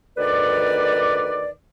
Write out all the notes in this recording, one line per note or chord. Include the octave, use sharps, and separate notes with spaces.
D2 D#3 B4 D5